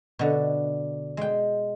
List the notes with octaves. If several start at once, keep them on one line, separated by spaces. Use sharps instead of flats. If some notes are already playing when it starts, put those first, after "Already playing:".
B2 D3
G#3 G5